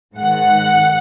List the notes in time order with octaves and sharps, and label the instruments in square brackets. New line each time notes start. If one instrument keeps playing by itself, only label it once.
[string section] G#2 D#3 F#5